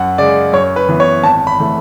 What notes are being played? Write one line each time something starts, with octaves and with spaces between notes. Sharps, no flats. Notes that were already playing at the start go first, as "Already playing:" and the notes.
Already playing: F#2 F#5
C#3 G#3 D5
F#2 C#5
B4
E3 B3
C#5
G#1 A5
B5
E3 A3